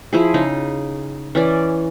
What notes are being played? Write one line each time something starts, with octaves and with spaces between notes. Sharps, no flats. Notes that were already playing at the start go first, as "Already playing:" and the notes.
F3 E4 G#4
C#3 D#4
E3 C#4 D5